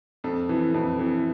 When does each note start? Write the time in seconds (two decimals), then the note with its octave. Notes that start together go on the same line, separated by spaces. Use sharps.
0.24 F2 A4
0.49 E3
0.74 F2
0.99 E3